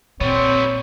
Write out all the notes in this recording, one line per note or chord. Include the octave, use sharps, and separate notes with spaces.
A#2 G3 B3 C4 C#5